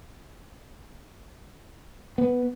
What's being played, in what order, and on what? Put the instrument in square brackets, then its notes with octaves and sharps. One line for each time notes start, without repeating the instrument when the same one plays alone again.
[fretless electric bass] B3